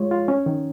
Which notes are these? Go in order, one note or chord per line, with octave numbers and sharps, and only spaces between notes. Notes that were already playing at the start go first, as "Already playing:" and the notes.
Already playing: G#3 F4 C#5
F4
C#4
D#3